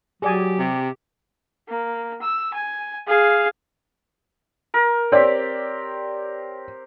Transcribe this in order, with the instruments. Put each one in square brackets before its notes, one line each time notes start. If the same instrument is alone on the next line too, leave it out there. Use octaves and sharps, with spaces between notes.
[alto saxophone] F#3 [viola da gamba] G4 [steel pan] G#4 D5 G#5
[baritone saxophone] C3
[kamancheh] A#3
E6
G#5
G#4 F5
[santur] A#4
[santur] C4 G4 [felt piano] C#5 D5